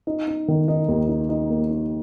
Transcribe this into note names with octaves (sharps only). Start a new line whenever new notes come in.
D#4
D#4
D#3
D#4
D#2
D#4
D#4
A#3
D#4